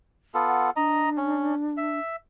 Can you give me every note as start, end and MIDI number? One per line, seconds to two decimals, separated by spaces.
0.34 0.70 59
0.34 0.70 65
0.34 0.70 69
0.47 0.71 78
0.76 1.99 62
0.76 1.09 75
0.76 1.09 82
1.17 1.55 61
1.77 2.16 76